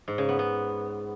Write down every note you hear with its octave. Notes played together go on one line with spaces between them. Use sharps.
G#2
C#3
B3
B3